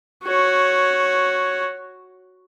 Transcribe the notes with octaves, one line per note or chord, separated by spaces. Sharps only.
F#4 C#5